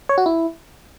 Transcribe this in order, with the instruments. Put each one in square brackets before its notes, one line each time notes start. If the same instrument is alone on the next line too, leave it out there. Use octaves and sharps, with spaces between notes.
[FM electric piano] C#5
F#4
E4